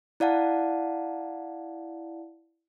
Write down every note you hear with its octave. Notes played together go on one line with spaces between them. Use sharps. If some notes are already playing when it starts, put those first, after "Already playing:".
E4 D5 F5 F#5 A5